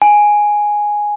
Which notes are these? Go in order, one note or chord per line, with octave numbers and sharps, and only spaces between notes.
G#5